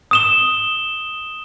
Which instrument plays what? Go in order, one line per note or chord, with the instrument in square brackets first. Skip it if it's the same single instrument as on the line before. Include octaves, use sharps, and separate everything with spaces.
[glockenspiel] D#6 E7 G7